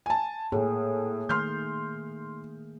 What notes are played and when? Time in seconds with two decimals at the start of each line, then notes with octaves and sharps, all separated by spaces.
0.06 G#5 A5
0.52 A2 A#3 G#4
1.29 D#3 A3 C6 F6 G6